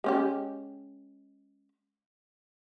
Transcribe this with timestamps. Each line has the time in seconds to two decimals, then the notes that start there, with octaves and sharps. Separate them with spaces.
0.04 G#3 C#4 G4